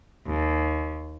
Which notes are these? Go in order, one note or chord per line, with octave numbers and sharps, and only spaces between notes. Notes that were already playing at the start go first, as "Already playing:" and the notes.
D#2